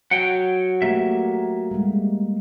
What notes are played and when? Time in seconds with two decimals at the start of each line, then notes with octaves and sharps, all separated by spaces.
0.11 F#3 F#5 G5
0.82 A3 A#3 G4 E5
1.71 G3 G#3